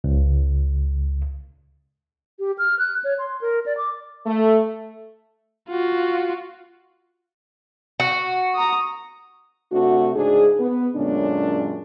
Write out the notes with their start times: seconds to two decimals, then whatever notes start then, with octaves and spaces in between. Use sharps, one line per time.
0.04 C#2
2.39 G4
2.58 F6
2.79 F#6
3.04 C#5
3.19 C6
3.41 A#4
3.66 D5
3.77 D6
4.26 A3
5.69 F4 F#4
8.00 F#4
8.55 A#5 D#6
9.72 C3 A3 D4 F#4
10.16 G#2 C#3 D4 G#4
10.60 B3
10.96 F#2 A#2 D3 G#3 C#4 D4